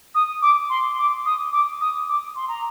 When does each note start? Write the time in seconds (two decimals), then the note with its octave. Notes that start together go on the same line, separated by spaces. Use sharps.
0.15 D#6
0.42 D6
0.70 C6
0.98 D6
1.26 D#6
1.52 D6
1.81 D#6
2.08 D6
2.36 C6
2.48 A#5